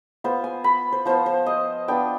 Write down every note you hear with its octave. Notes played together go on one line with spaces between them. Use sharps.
B3 F4 C5
G#5
B5
C5
F3 B3 F4 C5
C5
D#5
B3 D4 F4 G5